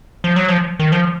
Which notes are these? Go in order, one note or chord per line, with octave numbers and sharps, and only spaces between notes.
F3
F#3
F3
D#3
F3